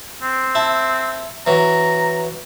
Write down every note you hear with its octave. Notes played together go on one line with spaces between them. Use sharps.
C4
E4 A5
E3 F#3 A#5